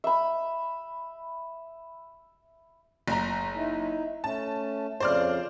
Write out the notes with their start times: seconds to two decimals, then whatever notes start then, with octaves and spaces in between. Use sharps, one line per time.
0.04 E5 B5
3.08 F#1 A#5
3.56 D#4 E4
4.24 A3 C#4 A5
5.00 F2 C#3 C5 D5 F6